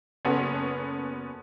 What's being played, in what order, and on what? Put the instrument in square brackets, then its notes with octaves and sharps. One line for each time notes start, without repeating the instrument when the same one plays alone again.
[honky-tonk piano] F#1 B3 C#4 F#4 A4